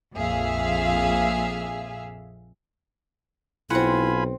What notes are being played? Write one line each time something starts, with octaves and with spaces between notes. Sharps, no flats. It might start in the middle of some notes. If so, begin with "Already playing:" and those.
A#1 F2 A#2 G#4 E5 F5
B1 C4 E4 F4 F#5 G#5 B5